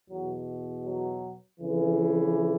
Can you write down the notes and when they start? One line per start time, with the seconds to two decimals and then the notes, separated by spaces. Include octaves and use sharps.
0.10 E2 F#3
0.15 B2
0.86 F#3
1.60 F2 C#3 E3